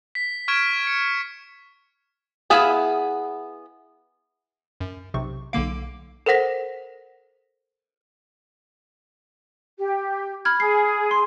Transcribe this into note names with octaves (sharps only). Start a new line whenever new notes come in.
B6
C#6 F6 G#6 D7 E7
C#7
B3 E4 G#4 E5 F5
F#2
B1 C3 C#6
B1 D3 A#3 F5 D6 D7
A4 A#4 C5 F#5 A#6 B6
G4
B5 F6 G#6
G#4 C7
C6